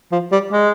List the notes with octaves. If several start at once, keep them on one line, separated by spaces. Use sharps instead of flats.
F3
G3
G#3